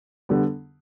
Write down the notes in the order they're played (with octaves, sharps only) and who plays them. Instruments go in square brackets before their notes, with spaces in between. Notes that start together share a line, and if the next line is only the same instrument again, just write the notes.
[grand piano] D3 G3 B3